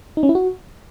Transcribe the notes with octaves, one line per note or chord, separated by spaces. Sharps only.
D#4
C#4
E4
F#4